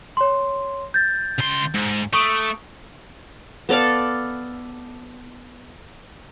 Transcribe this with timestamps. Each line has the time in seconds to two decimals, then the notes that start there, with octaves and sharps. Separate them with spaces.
0.17 C#5 C6
0.94 G6 A6
1.39 C#2 C6
1.75 G#2
2.13 A3 C#6 D#6 D7
3.69 B3 A4 D5 F5